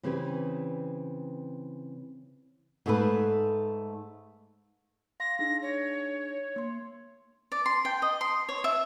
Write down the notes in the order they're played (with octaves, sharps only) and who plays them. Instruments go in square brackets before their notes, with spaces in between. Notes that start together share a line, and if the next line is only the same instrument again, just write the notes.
[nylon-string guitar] C#3 E3 C4 C#4 G4 B4
G#2 A3 G#4 A4 B4
[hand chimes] F5 C6 [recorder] A#6
[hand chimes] D4 D#4 G#4 [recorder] A#6
[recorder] C#5
[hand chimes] A#3 C6
[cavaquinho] D5
C6
G5
D#5
C6
C#5
E5